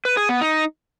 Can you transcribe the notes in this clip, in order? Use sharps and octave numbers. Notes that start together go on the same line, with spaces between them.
B4
G#4
B3
D#4